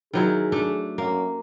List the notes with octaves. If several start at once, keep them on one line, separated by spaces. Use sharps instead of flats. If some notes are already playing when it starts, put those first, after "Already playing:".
D#3 F#3 E4 G#4
A3 D4
F#2 A#3